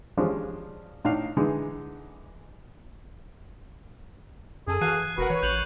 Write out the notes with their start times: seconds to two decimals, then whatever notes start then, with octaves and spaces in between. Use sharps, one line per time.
0.17 F3 G3 G#3 C#4 D4 F4
1.05 A2 D4 D#4 F5
1.37 D3 E3 G#3 D#4
4.67 G1 F#2 G#4 A4 D#7
4.81 E3 F#4 A4 F5 F#6 C7 D#7
4.96 G#6
5.18 E1 F#4 A#4 B4 F#5
5.30 E3 C#5
5.43 A1 G6 F7 F#7